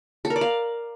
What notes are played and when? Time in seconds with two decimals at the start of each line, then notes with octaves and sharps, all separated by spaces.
0.25 A4
0.30 A#4
0.36 D5
0.41 F5